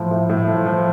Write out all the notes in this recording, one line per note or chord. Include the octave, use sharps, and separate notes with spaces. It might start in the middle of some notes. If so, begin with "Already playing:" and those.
Already playing: A2 F3
A2
A2
F3
F3